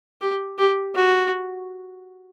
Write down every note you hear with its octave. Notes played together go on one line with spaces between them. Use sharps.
G4
G4
F#4